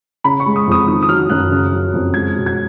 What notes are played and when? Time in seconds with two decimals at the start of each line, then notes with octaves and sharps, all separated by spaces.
0.24 C#3 B5
0.40 C#6
0.46 G#3
0.56 D#6
0.67 F2 D#6
0.88 D#3 D#6
1.03 D#6
1.09 F#3 F6
1.30 F#2 F#6
1.51 C#3
1.72 F#3
1.93 F2
2.14 G#3 G#6
2.36 B2
2.46 G#6